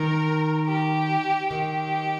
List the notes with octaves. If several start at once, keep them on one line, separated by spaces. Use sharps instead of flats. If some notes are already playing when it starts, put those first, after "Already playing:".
Already playing: D#3 A#4
G4
D#3 G4